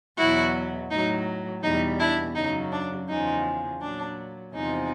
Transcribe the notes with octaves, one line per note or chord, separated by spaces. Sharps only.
E2 B2 F#3 E4 F#4
A2 F#3 D#4
E2 B2 G3 D#4
D4 E4
F#2 C#3 F#3 D#4
D4
E2 C#3 F3 G#3 D#4
A#2 F#3 D4
E2 C3 F3 G#3 D#4